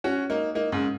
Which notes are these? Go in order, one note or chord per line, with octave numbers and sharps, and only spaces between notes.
C#4 F#4
A#3 D#4
A#3 D#4
G#2 C#3